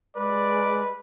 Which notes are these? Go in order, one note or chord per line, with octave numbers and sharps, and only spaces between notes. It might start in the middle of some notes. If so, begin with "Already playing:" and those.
G#3 B4 D5